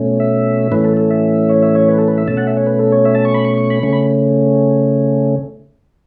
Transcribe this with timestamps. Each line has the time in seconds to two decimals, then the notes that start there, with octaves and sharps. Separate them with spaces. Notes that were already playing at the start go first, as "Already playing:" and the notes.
Already playing: B2 A3 C#4
0.20 E5
0.72 A2 E3 A3 C#4 B4
0.84 A4
0.97 A4
1.10 E5
1.49 C#5
1.63 E5
1.75 C#5
1.88 B4
1.98 A4
2.08 B4
2.18 E5
2.27 B2 A3 C#4 A5
2.37 F#5
2.47 E5
2.57 C#5
2.66 B4
2.79 A4
2.92 C#5
3.05 E5
3.15 A5
3.25 C#6
3.34 B5
3.45 C#6
3.58 C#6
3.70 B5
3.83 C#3 A3 C#4 C#6
3.93 B5